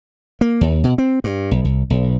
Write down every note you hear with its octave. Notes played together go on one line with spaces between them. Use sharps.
A#3
D#2
B2
C4
G2
B1
C2
B1